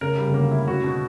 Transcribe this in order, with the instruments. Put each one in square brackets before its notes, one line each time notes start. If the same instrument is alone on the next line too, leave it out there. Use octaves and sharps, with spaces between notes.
[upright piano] C#3 [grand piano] A#4
[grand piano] G3
[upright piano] C#3
[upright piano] D3 [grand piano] A#3
[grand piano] E4
[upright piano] C#3 [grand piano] F#4
[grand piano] B2